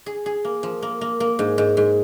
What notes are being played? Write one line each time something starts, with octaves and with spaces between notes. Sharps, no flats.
G#4
G#4
A#3
F3
A#3
A#3
A#3
G#2
G#2
G#2